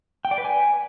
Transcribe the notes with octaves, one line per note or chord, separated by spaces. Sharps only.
G5
D5
B4
G#5